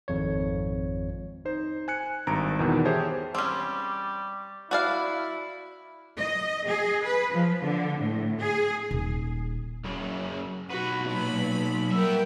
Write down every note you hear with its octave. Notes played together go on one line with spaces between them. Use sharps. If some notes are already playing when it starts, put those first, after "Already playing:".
G#1 F2 C#5
D#4 C5
G#5 F#6 C#7
G#1 G2 A#5 D7
E2 B2 D#3 E3
G4 G#4 C5 C#5 E5 A5
G3 C4 C#4
E4 F#4 D5 F5
D#5
G#4
B4
F3
D3
A2
G#4
D#1
F#2 C#3
B1 F#4 B4
A#2 F#3 B5
G3 B3 A#4 E5 G5